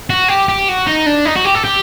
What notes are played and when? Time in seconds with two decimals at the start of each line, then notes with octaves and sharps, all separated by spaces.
0.10 F#4
0.28 G4
0.48 G4
0.68 F#4
0.87 D#4
1.07 D4
1.26 D#4
1.36 F#4
1.45 G4
1.55 A4
1.65 G4